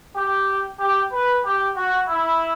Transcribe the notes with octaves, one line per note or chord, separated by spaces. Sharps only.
G4
G4
B4
G4
F#4
E4